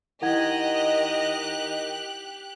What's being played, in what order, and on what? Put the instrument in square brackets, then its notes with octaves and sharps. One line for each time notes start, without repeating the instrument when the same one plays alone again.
[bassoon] D#3 [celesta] E4 F#5 G#6 [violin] G4 F#6 [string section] D#5